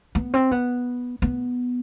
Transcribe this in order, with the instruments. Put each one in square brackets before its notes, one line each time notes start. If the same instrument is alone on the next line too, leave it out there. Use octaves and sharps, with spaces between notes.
[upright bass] B3
C4
B3
B3